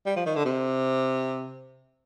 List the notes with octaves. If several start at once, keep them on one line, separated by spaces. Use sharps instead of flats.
G3
F3
D#3
D3
C3